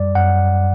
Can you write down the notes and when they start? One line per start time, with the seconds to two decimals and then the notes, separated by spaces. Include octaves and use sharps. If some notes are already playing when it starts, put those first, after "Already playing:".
Already playing: F#2 G3 D5
0.15 F#2 F#5